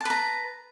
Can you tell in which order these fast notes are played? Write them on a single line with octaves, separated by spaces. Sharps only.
A5 B4 A#5